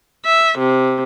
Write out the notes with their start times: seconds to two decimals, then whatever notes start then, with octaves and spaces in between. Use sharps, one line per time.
0.24 E5
0.57 C3